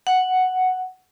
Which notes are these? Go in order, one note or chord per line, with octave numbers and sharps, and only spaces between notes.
F#5